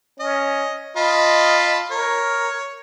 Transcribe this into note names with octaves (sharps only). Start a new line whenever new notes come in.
C#4 D#5
F4 D#5 A5 B5
A#4 C#5